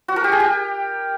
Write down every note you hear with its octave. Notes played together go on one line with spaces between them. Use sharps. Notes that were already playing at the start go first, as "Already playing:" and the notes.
F#4
A#4
G4
G#4
G4